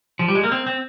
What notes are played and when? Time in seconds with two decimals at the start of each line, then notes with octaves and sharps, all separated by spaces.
0.19 F3
0.28 G3
0.35 G#3
0.44 A#3
0.52 C4
0.66 C4